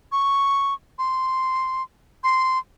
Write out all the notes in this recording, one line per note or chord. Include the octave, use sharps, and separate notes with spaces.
C#6
C6
C6